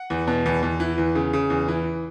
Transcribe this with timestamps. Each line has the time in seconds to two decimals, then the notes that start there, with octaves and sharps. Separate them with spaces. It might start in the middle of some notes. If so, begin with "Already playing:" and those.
Already playing: F#5
0.10 E2
0.27 B2
0.46 E2
0.63 E2
0.80 E3
0.98 E2
1.15 C#3
1.33 C#3
1.50 E2
1.68 E3